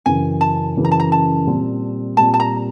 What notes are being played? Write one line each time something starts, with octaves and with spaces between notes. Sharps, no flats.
F#2 C#3 E3 G#5
A5
F#2 C#3 E3
A#5
A5
A#5
A5
A#2 G3 C4
A#2 G3 C4 A5
A5
A#5